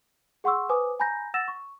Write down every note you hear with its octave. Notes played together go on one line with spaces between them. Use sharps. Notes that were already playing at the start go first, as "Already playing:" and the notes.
G#4 F#5 C6 C#6 E6
B4 C5 G#5 D6 D#6
G#5 A#5 B5 G6 A#6
F#5 E6 A6 A#6 E7
C#6